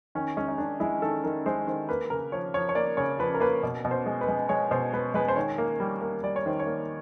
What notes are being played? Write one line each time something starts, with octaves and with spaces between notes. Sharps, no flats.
D#3 C#4
G#3 C#4
D#4
D#3 D4
G#3 E4
D#3 A4
D#3 A#4
G#3 C5
D#3 C5
A#3 B4
C#3 A#4
F3 C#5
F3 C#5
C#5
A#3 D5
C#3 C#5
F3 B4
A#4
A#3 B4
B2
B2
C5
G#3
B4
G#3
G#3 C#5
B2 C5
G#3 B4
G#3 B4
C5
D#3 C#5
A#3
G3
A#3
G3 D5
C#5
D#3 C5
C#5
A#3